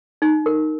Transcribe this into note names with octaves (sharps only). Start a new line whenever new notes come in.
D#4
A#4